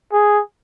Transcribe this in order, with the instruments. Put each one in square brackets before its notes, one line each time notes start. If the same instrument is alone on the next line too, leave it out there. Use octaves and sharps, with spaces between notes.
[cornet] G#4